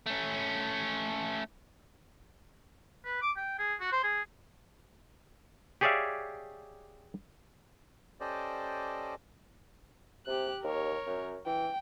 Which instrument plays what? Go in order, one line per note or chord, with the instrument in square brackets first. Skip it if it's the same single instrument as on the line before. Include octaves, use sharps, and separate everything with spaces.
[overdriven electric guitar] A3 C#4
[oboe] B4
D6
G5
G#4
F#4
C5
G#4
[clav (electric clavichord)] G4 G#4 C#5 D5 E5 F5
[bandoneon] C#4 G4 A4 C5 D5 D#5
[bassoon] C3 [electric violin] G4 F#6
[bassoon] D#2 [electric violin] A#4 C#5
[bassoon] F#2
[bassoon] E3 [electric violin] G5